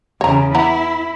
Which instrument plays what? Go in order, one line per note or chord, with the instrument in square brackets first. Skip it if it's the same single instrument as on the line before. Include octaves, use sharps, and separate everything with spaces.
[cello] E2 C#3 [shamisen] C#5 A#5
[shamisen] E3 B3 A#5 [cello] E4